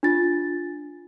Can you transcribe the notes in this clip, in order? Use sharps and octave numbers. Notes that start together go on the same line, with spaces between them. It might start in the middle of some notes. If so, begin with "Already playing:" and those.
D4 F4 A6